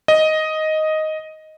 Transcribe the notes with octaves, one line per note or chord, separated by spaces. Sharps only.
D#5